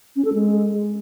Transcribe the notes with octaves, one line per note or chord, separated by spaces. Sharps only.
C#4
A4
G#3